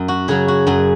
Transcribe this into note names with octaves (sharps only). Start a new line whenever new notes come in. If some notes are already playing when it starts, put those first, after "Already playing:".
Already playing: F#2
F#4
C#3 F#3 G#4
F#4
F#2 G#4